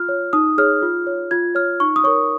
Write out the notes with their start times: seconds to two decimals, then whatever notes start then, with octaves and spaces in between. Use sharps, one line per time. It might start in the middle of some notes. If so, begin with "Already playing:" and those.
Already playing: F4 F6
0.09 C#5
0.33 D#4 D#6
0.58 G#4 C#5 F6
0.83 F4
1.07 C#5
1.31 F4 G#6
1.55 C#5 F6
1.80 D#4 C#6
1.96 D#6
2.04 A#4 C#5 C#6